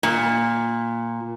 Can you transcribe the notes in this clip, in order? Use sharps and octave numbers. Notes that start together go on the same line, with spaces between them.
A#2